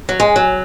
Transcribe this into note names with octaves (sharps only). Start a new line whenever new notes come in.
F#3
G#3
F#3